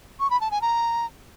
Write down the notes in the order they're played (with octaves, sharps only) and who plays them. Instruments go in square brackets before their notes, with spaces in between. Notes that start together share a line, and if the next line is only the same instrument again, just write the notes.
[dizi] C#6
B5
A5
G#5
A#5